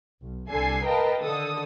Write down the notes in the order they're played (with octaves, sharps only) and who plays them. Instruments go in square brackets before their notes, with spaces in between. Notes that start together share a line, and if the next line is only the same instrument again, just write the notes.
[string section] B1
C2 D3 A4 G#5 C7
A#4 B4 D#5 F5 G5 A5
D3 D#3 A4 D#6